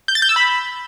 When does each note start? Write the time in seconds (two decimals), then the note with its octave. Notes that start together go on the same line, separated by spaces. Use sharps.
0.08 G6
0.15 A6
0.22 G6
0.29 E6
0.36 B5